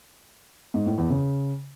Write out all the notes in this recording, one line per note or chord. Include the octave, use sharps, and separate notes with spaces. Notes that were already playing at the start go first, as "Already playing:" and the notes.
G#2
A2
E2
C#3